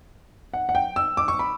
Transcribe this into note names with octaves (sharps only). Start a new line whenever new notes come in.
F#5
F#5
G5
E6
D6
C#6
B5